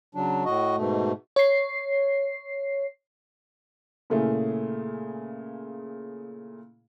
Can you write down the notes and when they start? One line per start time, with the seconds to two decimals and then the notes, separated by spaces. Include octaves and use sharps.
0.15 C#3 F#3 D4
0.45 A2 F#4 D#5
0.76 G#2 B2 A3
1.36 C#5 C7
4.10 A#2 C#3 A3 E4 G#4